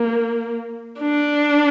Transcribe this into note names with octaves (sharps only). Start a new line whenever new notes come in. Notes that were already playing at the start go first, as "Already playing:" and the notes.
Already playing: A#3
D4